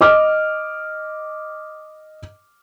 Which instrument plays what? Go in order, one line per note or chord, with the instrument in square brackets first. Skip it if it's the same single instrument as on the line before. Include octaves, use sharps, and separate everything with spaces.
[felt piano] D#5 D6 F6